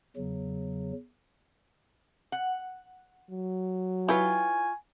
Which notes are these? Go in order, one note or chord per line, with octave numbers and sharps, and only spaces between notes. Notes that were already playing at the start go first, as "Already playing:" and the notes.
E2 C#3 F#3
F#5
F#3
E4 F4 B4 C#5 G5 G#5